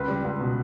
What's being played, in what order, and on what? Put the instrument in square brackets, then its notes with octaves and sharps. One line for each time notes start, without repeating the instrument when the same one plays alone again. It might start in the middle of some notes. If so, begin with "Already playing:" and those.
Already playing: [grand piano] C#2 B4
G3
C#2
B2